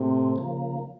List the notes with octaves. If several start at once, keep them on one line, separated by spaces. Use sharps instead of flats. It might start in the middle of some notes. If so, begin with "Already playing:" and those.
Already playing: A2 C3 A3 C4
C#3 F3 A#3